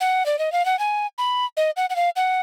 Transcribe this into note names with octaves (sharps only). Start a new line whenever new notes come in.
F#5
D5
D#5
F5
F#5
G#5
B5
D#5
F#5
F#5
F5
F#5